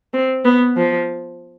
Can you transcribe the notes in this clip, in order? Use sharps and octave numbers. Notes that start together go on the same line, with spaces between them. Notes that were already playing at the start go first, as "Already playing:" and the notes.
C4
B3
F3